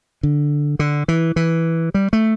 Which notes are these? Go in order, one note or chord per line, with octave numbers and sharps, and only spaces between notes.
D3
D3
E3
E3
G3
A3